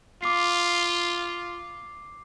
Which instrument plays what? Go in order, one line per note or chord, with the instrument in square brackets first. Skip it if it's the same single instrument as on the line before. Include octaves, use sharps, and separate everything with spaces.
[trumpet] F4 [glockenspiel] D6 C7